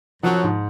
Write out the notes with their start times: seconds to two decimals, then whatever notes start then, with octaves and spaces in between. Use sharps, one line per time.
0.23 F#2 F3 F#3
0.44 G#2